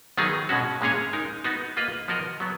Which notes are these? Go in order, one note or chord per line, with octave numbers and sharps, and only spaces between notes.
D#3 F#3 B3 D#4 G#4
B2 G#3 C#4 F#4
A#2 G#3 C#4 G#4 C#5
G#3 D#4 A#4
B3 D#4 F#4
A#3 F4 B4 D#5
F3 B3 F#4 A#4 D#5
F#3 B3